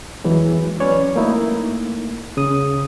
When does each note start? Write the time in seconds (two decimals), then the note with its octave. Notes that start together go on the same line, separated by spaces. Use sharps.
0.24 E2 E3 F#3 G#3
0.80 F#3 C#4 B4 C#5 D5
1.16 A3 A#3 D#4 E4
2.37 C#3 D#6